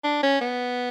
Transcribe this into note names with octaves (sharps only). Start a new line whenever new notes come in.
D4
C#4
B3